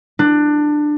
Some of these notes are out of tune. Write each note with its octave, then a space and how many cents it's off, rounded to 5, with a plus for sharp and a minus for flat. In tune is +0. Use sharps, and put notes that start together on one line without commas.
D4 +20